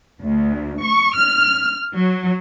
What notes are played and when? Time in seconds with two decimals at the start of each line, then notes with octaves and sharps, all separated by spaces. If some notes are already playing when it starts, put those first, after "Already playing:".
0.21 D2
0.81 C#6
1.16 F6
1.94 F#3